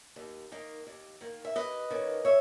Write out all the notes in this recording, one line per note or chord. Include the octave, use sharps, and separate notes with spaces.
D#2
D#3 A#3
D#2
D#3 A#3
E5
D#2 B4 D#5
D#3 A#3 C#4
C#5 E5